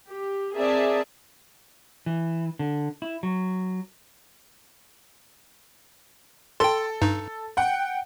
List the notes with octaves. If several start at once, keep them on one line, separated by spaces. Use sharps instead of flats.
G4
C4 G#4 A#4 D5 E5 A5
E3
D3
E4
F#3
A4 G5 C6
G2 D#4
F#5 G5